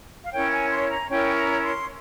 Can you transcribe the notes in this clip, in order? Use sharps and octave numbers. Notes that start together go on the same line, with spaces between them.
F5
C#4 E4 A#4 C#5 G5
G#5
C6
A#5
C#4 E4 A#4 C#5 G5
A#5
C6